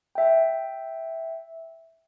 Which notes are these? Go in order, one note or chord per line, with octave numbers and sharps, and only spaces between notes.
E5 G5